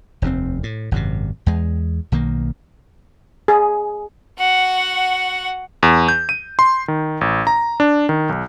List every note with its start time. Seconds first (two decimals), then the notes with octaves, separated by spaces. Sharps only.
0.22 F1 D#2 C3 C4
0.63 A2
0.91 G#1 F#2 A2 C3
1.46 E2 G#3
2.12 B1 D#3 A#3
3.48 G#4
4.39 F#4 F#5
5.83 E2
6.08 G6
6.29 D#7
6.59 C6
6.88 D#3
7.21 A1
7.47 A#5
7.80 D4
8.09 D#3
8.29 B1